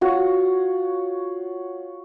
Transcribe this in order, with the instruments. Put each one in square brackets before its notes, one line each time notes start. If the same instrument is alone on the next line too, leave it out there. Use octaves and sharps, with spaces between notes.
[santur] F4 F#4 C#5